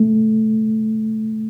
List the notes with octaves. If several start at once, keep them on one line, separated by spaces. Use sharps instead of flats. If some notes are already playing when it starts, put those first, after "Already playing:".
Already playing: A3